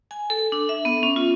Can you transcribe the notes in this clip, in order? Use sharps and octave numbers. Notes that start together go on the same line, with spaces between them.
G#5
A4
D4
E5
B3
C#4
F4